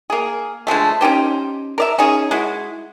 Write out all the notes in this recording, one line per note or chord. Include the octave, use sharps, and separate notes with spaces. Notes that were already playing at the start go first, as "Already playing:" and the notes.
A#3 G#4
D3 F3 G#3 A3
C#4 D#4 G4 C5
A#4 D5 E5
C#4 D#4 G#4
G#3 E4 F#4